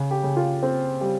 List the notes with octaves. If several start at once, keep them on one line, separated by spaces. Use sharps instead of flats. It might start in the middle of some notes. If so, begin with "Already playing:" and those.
Already playing: C#3
G4
C#3
F4
C4
G3